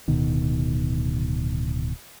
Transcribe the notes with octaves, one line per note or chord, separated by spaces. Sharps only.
D1 B2 D#3